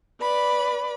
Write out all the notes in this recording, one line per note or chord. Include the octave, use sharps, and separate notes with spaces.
B4 D5 B5